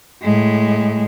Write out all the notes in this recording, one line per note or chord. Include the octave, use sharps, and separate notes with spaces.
A2 G#3